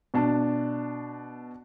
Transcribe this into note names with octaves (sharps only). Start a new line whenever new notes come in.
B2 D4 A5